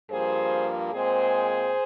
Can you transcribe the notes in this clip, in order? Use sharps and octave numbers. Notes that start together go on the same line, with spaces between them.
G2 F3 A#3 G#4 C5
A#2 G#3 C4 G#4 C5